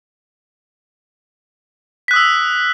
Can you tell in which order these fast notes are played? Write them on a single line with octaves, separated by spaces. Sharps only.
B6 F#6 D#6 E6